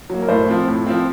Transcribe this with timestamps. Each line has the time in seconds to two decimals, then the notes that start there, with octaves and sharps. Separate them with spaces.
0.10 F#3 A#3
0.22 A#4
0.29 A2 C5
0.48 F3 C4
0.68 A2
0.86 F3 C4